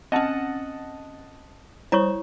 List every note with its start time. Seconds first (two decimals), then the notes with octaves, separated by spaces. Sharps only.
0.12 C4 C#4 D#5 F#5 A5
1.92 G3 E4 C5 C#5 C#6